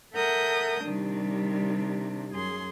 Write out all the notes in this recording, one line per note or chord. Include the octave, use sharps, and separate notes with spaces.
A4 A#4 E5 F#5 D#6 G6
C3 D#3 G3 D4
F#2 G#4 C6